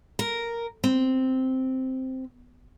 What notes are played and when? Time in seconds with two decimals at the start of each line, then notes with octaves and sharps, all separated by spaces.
0.19 A#4
0.84 C4